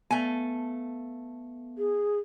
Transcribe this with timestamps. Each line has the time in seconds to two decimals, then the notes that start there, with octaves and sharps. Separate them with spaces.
0.11 A3 B3 G#5
1.78 G#4